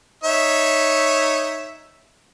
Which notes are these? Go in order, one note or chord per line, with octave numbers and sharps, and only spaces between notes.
D#4 C#5 E5